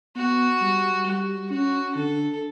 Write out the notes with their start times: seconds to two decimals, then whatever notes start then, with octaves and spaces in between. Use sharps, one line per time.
0.15 B3 F#4
0.60 G3
1.05 G3 F#4
1.50 C#4 F#4
1.95 D3 A4